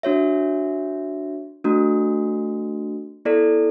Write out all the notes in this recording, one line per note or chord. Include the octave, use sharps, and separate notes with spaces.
D4 F#4 C#5 E5
A3 D4 F#4
B3 E4 A4 D5